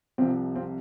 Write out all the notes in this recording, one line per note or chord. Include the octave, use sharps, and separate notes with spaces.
C2 C3 F3 C4 F4
C4 F4